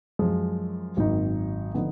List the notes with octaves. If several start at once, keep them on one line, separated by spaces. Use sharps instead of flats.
F#2 F3 G#3
G#1 F#2 D#3 A#3 D#4
D3 F3 B3 D#4